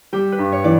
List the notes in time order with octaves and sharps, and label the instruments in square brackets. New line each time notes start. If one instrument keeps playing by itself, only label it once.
[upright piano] G3 [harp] G4
[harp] B4
[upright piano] G2
[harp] C#5
[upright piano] E3 [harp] D5